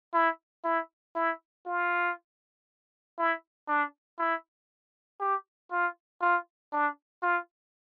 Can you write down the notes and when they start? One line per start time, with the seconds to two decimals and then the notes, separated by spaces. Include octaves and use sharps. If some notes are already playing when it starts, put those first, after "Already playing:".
0.14 E4
0.64 E4
1.15 E4
1.66 F4
3.18 E4
3.68 D4
4.19 E4
5.20 G4
5.71 F4
6.21 F4
6.73 D4
7.23 F4